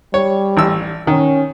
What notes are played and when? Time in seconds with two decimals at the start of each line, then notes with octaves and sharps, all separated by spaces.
0.14 G3 C#5
0.57 A1 E6
1.07 D#3 C#4